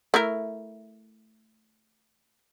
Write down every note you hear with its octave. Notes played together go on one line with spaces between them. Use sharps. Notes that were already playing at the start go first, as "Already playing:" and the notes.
A3 E4 A#4